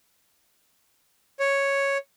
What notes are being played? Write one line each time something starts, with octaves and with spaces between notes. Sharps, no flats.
C#5